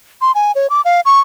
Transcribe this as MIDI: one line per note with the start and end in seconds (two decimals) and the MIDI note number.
0.21 0.32 84
0.35 0.52 80
0.55 0.67 73
0.70 0.81 86
0.85 1.01 77
1.05 1.20 85